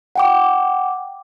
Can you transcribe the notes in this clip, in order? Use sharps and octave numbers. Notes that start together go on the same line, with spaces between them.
F#5 G5 D6